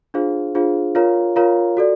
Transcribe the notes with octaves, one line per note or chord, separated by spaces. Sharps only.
D4 F4 G#4 C5 F5
D4 F4 G#4 C5 F5
F4 A#4 C#5 F5 A#5
F4 A#4 C#5 F5 A#5
F#4 A4 D5